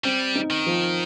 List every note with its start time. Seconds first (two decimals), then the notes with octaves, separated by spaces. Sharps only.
0.04 G3 C4
0.36 D#4
0.51 D#3
0.66 F3